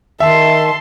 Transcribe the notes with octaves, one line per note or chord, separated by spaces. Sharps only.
D#3 E5 A5 C6